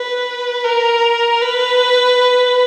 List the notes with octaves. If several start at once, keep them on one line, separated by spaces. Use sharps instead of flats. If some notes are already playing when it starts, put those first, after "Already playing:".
Already playing: B4
A#4
B4